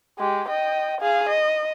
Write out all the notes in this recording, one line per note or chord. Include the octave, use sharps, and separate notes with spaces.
G#3 G4
D#5 G5
G#4 F5
D#5